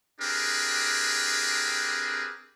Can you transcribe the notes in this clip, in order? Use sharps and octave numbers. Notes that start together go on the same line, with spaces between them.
C4 D4 G4 G#4 A#4 B4